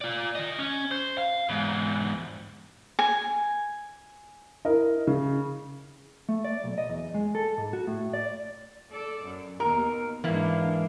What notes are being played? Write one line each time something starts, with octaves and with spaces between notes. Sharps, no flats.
F4 D5
D#3 D#5
C#4
C5
F5
E2 G#2
G#5
E4 A#4 D#5
C#3
A3
D5
B1
D#5
E2
G#3
A4
G#2
F#4
A2
D5
A4 D5
F#2
D#2 B2 A#4
G#2 E3 A#3 D4 E4 F5